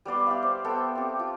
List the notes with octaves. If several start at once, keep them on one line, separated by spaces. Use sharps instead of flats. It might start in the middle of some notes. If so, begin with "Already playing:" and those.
G3 B3 D5 C6
G4 E5 F5
C5
B3 A4 C5 G5
C4 G4
F4